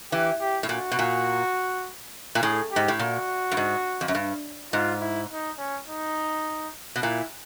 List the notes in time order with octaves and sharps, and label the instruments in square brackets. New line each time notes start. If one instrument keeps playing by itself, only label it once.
[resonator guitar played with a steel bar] E3 [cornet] G4
[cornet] G4
[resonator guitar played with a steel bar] A2
[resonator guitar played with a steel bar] A#2 [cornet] F#4
[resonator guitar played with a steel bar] B2
A#2
A#2
[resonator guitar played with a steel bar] A2 [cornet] G#4
[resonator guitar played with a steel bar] G#2 [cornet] G4
[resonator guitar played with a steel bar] A2
[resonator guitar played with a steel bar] A#2 [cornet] F#4
[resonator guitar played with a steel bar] G2
G#2
F2
F#2
G2
[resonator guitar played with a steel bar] G#2 [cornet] F4
[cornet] E4
D#4
C#4
D#4
[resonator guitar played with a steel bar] B2
[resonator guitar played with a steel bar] A#2 [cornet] E4